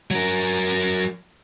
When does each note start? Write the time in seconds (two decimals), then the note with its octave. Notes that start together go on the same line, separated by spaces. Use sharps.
0.11 F#3 A#4